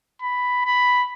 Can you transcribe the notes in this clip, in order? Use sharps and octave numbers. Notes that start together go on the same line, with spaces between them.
B5
B5